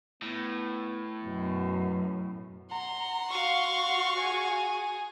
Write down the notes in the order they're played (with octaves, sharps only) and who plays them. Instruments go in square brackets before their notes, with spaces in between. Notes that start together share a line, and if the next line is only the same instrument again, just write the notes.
[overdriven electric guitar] A2 [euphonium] B3
[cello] F#2 [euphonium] B2
[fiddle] F#5 C6 [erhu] A#5
[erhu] F#4 [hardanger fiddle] F5 C#6
[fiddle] G#4 G#5